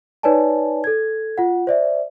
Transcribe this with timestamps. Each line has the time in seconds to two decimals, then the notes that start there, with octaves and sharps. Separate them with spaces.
0.23 D#4 B4 C#5 D5 G#5 A5
0.84 A4 G#6
1.38 F4 F#5
1.67 C5 D5 E5